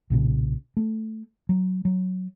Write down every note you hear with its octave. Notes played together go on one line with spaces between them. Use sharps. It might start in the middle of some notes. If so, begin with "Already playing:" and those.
B1 A#2 C#3
A3
F#3
F#3